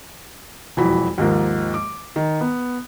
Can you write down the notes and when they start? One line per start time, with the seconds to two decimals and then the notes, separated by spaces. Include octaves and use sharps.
0.77 E1 F2 E3 F#3 B5
1.18 D#2 G#2 F3 A#3
1.74 D6
2.16 D#3
2.41 B3